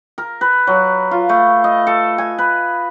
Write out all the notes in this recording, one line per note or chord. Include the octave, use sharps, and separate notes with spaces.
A#4
B4
F#3
F4
A3
D#5
A4
G#5
B4